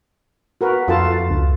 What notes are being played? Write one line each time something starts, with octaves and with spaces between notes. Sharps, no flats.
F#4 A#4 B4
F2 F4 A4 A5
C#2